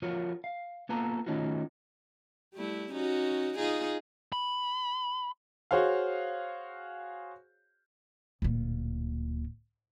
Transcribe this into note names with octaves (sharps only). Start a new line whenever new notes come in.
F3 F4 F#4 A#4 C#5
F5
A#3 B3 F4 A4 A#5
D#3 A3 C#4 D#4 F4 F#4
G3 A3 E4
C#4 D#4 F#4
D#4 F4 G#4
B5
F#4 G#4 C5 C#5 F5
D1 A#2